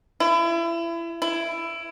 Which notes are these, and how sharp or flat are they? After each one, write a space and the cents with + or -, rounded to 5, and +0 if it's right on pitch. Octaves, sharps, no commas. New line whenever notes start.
E4 +30
E4 +15